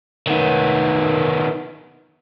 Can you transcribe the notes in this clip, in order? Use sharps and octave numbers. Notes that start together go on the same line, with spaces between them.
D#3 B3